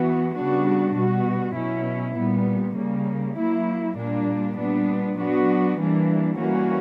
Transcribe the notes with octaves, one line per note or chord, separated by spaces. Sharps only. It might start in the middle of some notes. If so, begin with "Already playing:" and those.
Already playing: E3 B3 F#4
C#3 G3 B3 D4 F#4
B2 G3 B3 F#4
B2 F#3 C#4 E4
A#2 G3 B3
C#3 G3 A#3
F#3 A#3 E4
A#2 G3 A#3 D4
A#2 G3 B3 D4
F#3 B3 D4 F#4
E3 G3 A#3 D4
E3 G3 A#3 C#4 F#4